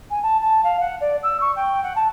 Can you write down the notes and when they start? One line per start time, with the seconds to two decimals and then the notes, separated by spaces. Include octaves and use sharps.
0.10 G#5
0.23 A5
0.41 A5
0.64 F5
0.80 F#5
1.01 D5
1.23 E6
1.40 C#6
1.56 G5
1.83 F#5
1.95 A5